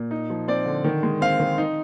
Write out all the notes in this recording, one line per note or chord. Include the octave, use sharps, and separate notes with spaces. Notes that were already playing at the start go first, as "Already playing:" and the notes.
Already playing: A#2
D#4
F3
C4 D5
D3
D#3
G#3
C4 F5
D#3
D#4